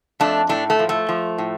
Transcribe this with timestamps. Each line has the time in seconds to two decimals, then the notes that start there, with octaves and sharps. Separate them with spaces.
0.20 F2 A3 D4
0.49 A2 A3 D4
0.70 A3
0.79 F3
0.89 A3
1.09 F3
1.38 A2